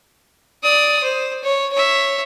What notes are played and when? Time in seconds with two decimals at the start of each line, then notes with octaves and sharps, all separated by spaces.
0.63 D5 D#6
1.03 C5
1.44 C#5
1.73 C#5 E5